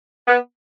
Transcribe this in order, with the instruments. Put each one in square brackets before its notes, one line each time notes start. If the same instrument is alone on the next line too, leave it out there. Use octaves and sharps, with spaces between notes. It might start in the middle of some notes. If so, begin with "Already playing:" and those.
[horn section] B3